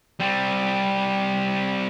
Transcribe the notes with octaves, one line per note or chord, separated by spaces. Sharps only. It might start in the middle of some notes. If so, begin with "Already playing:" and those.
G3 C4